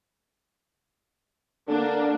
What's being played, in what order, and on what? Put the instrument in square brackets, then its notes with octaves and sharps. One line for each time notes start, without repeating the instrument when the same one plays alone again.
[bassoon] D3 [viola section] A#3 D4